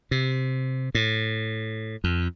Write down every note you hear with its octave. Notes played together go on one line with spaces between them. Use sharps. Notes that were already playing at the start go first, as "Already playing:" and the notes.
C3
A2
F2